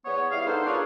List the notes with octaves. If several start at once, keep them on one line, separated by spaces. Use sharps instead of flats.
E2 B3 C#5
G3 E4 G#4 F5
B3 D4 D#4 A4 C5
D4 F4 G#4 A#4 B4 C#5